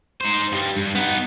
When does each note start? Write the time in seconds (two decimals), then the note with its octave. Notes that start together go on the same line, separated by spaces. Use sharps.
0.21 D#4 C5
0.52 G2 G3
0.77 G2
0.95 B3 D#4